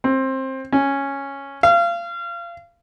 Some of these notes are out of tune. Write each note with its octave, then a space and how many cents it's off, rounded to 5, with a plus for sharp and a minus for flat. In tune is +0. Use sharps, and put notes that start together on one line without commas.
C4 +20
C#4 -5
F5 -30